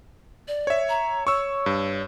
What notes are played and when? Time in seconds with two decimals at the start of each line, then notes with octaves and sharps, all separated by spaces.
0.48 D5
0.67 C#5 E5
0.89 A#5
1.27 C#5 C#6 E6
1.66 G2